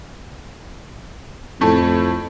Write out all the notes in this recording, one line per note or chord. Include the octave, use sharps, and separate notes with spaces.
F2 A2 A3